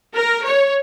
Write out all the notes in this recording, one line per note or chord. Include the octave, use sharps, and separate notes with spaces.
A#4
C#5